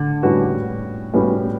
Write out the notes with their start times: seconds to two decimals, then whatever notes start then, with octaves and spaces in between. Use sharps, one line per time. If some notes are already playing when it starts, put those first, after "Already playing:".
Already playing: A2 D3
0.23 A2 G3 C#4 F#4 B4
1.14 A2 G3 C#4 F#4 B4